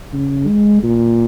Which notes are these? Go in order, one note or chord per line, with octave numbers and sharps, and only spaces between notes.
C#3
G#3
A#2